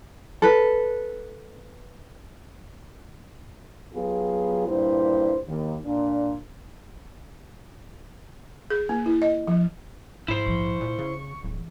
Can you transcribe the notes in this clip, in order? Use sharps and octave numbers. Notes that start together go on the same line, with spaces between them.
A4 B4
F#3 B3 F4 G4 G#4
G2 A#2 G3 E4 C5
D#2
A#2 D4
G#4
A#3
E4
D#5
F3
F2 G#2 E4 C5
A#1 F3 C#6
C#2 A#2
C#3
D1 C#2 E3